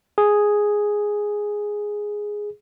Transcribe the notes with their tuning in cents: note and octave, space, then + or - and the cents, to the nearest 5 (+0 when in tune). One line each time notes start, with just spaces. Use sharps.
G#4 +0